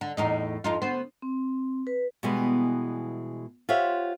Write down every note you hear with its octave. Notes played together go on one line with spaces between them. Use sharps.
D3
E2 A2 D#4
F2 D#4 F4
D2 B3 C5
C4
B4
B2 E3 G3 G#3 B3
F4 G4 C5 C#5 E5 F#5